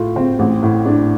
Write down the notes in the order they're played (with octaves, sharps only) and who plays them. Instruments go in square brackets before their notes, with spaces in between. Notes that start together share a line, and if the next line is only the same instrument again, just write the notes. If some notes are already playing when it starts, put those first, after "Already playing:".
Already playing: [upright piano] A2 A3 F4
C4
A1
A2
D4